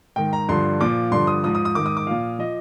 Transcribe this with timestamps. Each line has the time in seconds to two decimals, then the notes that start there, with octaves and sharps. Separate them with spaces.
0.16 G#2 D#3 G5
0.33 A#5
0.49 G2 D3 F3 C6
0.80 A#2 F3 D6
1.11 G2 D3 F3 C6
1.27 D#6
1.44 G#2 F3 D#6
1.55 D#6
1.65 D#6
1.75 G#2 D#3 D6
1.86 D#6
1.97 D6
2.07 A#2 F3 F5
2.39 F3 D#5